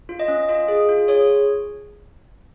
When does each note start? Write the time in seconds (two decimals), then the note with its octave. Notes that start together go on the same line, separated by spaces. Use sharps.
0.09 F4
0.20 D#5
0.28 C#4
0.49 F4 D#5
0.68 G#4
0.89 F4
1.08 G#4 C#5